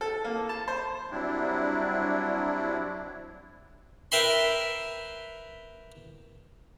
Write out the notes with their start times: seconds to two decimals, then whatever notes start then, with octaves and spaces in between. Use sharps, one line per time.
0.01 A4
0.24 A#3
0.49 A5
0.68 C5
1.11 F#3 G3 C4 D4 E4
4.12 A#4 B4 E5 G5 B5 C6